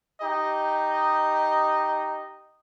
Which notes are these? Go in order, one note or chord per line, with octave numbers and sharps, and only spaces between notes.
D#4 G4 D#5